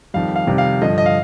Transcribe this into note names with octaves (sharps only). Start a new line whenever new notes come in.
F2 D#3 G3 F5
F5
F2 C3 D#3 G3
F5
G2 D3 F3 D#5
D#5
F5